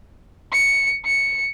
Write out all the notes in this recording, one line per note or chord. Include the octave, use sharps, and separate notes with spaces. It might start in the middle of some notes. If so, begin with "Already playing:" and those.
C#7
C#7